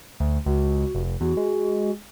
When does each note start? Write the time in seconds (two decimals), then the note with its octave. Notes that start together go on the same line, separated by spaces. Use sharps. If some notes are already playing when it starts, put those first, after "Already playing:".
0.20 D2
0.46 C#2 F#4
0.95 F1
1.21 E2 F#4
1.37 G#3